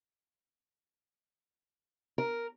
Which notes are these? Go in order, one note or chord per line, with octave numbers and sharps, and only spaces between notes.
A#4